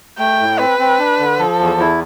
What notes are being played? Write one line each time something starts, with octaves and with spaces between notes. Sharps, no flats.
A3 G5
A2
C4 B4
C4
D4
D3
F3 A4
E2
E4